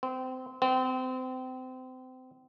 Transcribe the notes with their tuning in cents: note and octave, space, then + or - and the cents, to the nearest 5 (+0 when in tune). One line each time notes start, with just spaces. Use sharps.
C4 -25
C4 -30